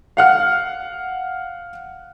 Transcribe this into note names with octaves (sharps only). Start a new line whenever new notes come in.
F5 F#5 F6